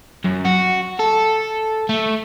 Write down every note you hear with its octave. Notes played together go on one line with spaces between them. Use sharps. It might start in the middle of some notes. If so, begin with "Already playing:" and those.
F#2
F#4
A4
A3